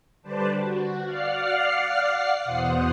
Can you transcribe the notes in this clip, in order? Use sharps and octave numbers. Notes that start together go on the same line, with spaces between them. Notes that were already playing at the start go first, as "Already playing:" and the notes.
D3 G3 B4 C5 D5 A5
F#4
D5 F5 F#5 F6 C7
E2 B2 C5 F#5 D#6